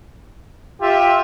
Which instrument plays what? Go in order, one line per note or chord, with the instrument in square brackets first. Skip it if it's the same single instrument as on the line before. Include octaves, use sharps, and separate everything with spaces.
[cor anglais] F4 [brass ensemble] G4 E5